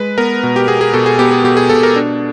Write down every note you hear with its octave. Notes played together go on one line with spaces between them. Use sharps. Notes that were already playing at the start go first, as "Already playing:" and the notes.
Already playing: G#3 B4
B3 A#4
B2
G4
B3 G#4
G#4
B2 A4
G#4
B3 G4
G#4
B2 G4
G#4
B2 A4
A#4
D4